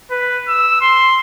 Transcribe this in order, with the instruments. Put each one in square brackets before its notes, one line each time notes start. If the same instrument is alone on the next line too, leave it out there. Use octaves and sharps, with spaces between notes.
[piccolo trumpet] B4
E6
C6